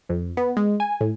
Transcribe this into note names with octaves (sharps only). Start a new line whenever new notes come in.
F2
B3
G#3
G#5
A2